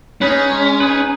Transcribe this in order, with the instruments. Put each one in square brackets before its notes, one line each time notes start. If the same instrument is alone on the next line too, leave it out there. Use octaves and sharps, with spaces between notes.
[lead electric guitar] C#4 [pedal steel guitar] D#4 G#4 B4
[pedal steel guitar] G#3
D#4 G#4 B4